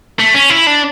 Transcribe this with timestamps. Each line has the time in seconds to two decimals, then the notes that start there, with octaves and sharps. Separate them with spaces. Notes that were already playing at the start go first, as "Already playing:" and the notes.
0.19 A3
0.34 C#4
0.50 E4
0.67 D4